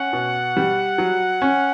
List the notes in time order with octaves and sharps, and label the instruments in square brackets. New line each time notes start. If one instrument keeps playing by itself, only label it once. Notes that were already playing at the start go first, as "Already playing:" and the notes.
Already playing: [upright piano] C#4 [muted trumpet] F#5
[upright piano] B2
G3
F#3
C#4